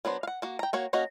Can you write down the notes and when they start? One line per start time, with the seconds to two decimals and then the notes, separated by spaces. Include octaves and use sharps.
0.05 F#3 B3 D4 C5
0.23 F5 F#5
0.42 A#3 F#4
0.59 G5 A#5
0.73 A#3 F#4 C#5
0.93 A#3 C#4 F#4 D#5